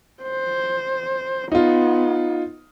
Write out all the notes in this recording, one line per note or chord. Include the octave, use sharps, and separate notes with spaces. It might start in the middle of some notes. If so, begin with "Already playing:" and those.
C5
B3 D#4 F4